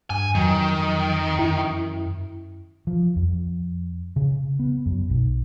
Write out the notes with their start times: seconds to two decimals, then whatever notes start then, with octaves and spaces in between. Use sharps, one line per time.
0.10 G2 G#5
0.35 F2 D#3 F#3
1.39 F#2 E4
2.87 F3
3.16 F2
4.16 C#3
4.59 B3
4.86 F#2
5.10 B1